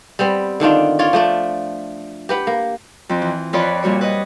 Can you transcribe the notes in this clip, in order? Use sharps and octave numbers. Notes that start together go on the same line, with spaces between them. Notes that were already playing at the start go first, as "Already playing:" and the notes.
G3 B3 C4
D3 D#3 D4 F4
F4 C#5 D5
F3 A3 D4
G4 B4 F#5
A#3
F2 C4
E3
F2 F4 B4 C#5 D5 B5
A#2 G3 F#4 C#5
B4 C#5 D#5